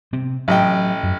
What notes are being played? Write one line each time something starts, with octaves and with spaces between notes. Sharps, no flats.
C3 C4
A1 F#3 D#5 G5
F#2